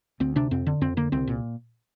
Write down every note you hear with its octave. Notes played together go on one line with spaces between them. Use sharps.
D2 C4
C3 D4
F2 C4
D3
F2 C4
D3 A#3
C2 C4
A#2